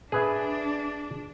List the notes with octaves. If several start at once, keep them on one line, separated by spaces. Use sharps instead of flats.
D4 G#4 B4 E5